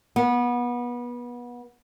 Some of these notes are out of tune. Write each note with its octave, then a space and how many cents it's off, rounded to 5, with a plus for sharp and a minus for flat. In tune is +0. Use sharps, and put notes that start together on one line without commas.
B3 -25